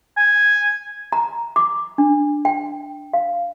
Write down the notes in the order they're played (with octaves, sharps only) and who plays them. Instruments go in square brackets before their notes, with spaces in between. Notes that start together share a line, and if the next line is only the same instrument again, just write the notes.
[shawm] G#5
[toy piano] A#5
D6
D4
G5
F5